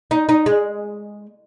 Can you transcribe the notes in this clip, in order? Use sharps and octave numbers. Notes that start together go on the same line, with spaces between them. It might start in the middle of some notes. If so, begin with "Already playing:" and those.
D#4
D#4
G#3